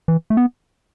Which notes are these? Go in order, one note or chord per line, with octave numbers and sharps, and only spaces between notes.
E3
A3
B3